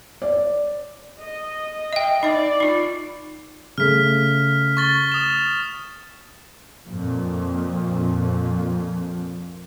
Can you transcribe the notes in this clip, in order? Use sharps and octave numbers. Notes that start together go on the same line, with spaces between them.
D5
D#5
E5 G5
D#4 D5 D#5
D#4 F4
C#3 A3 F6 B6
C#6 A6 G7
D#6 E7
F2 A#2